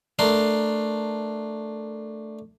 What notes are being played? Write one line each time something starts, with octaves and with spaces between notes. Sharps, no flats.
A3 D4 A#4 C6